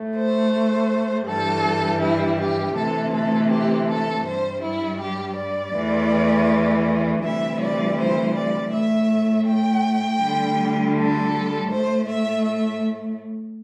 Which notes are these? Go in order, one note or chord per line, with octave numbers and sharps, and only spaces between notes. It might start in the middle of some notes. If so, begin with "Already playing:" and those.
Already playing: A2 A3
C5
G2 E3 G3 A4
E4
G4
D2 C3 E3 A3 A4
A4
G4
A4
G2 G3 C5
E4
G4
D5
E2 E3 A3
D2 C3 E3 G3 E5
D5
C5
D5
A2 A3 E5
G5
D2 D3 G3
A4
A2 A3 C5
E5
E5